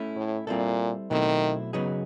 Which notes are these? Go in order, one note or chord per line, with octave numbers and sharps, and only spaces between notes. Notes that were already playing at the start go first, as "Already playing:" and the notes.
Already playing: A3 C#4 E4
A2
A#2 G3 C4 E4 A4
B2 D#3 F#3 A3 C4 E4
C#3 F#3 B3 D#4 G#4